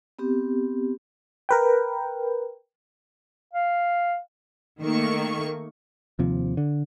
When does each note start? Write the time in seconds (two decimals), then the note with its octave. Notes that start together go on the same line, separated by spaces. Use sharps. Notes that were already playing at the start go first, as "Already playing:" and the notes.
0.19 B3 C4 G4
1.49 A#4 B4 G5
3.53 F5
4.81 D#3 A3 A#3 C#6
6.19 D#2 C3 F3
6.57 D3